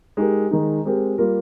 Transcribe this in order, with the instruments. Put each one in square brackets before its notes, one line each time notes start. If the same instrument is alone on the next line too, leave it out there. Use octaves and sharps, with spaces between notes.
[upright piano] G#3 D#4 G4 A#4
D#3 G#3 D#4
G#3 C4 G4 A#4
G3 A#3 F4 A#4